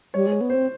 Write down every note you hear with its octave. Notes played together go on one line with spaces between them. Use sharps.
G3 C#5
G#3
C#5
B3
C4 C5